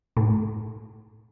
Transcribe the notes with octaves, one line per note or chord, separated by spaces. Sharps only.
A2